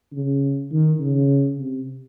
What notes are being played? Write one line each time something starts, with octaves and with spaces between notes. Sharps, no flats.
C#3
D#3
C#3
C3